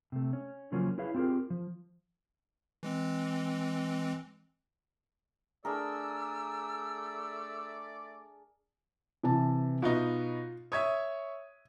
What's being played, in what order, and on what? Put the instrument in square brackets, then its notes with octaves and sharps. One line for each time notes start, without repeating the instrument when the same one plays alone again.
[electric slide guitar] C3 A3
C#4
C#3 F3 F#3 A#3 C#4
E4 G#4 B4 C#5 F5
C4 F4 G4 G#4 A#4
F3
[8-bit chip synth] E3 G#3 C4
[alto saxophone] A3 [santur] D4 G#4 A#4 [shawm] D5 [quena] E6
[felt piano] C3 E3 A5
[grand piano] B2 B3 D#4 [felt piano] F4
[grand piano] C#5 E5 [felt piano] D#6 G#6